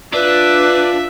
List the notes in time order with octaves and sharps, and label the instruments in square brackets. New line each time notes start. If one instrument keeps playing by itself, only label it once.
[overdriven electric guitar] D4 [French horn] F4 [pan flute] B4 [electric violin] E5